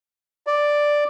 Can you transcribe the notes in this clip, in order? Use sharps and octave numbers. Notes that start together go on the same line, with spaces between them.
D5